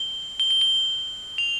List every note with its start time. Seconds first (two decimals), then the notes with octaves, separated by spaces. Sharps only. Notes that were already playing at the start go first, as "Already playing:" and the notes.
Already playing: G7
0.40 G7
0.51 G7
0.61 G7
1.38 F7